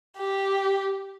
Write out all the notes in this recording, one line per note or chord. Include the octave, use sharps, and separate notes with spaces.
G4